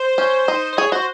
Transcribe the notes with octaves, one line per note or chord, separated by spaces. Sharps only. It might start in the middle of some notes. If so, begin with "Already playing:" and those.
Already playing: C5
C#4
D#4
C5
G#4 C#5
F#4 C5